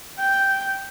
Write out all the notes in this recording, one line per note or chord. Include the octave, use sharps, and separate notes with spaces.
G5